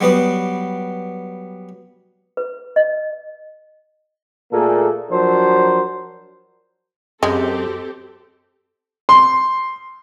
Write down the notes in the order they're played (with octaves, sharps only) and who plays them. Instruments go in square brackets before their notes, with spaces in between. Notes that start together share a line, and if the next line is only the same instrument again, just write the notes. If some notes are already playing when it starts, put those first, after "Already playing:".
[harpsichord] F#3 G3 B3 B4 D#6
[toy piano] B4
D#5
[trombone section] A#2 A3 A#3 G#4 A4
F3 F#3 D4 A#4 C5
[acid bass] F#2 [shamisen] G#3 [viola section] C4 G4 A4
[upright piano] C6